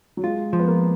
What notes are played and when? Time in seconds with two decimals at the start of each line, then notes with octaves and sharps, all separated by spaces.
0.17 F#3
0.24 G#3 F4
0.53 F3
0.59 B3
0.68 A#3